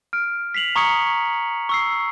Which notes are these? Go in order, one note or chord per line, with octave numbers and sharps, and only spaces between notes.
F6 D7
B6 C7 F7 F#7
A#5 C#6 D#6 G#6 C#7
C#6 E6 C7